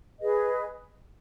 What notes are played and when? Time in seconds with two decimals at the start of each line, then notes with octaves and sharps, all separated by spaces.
0.20 G#4 B4 D#5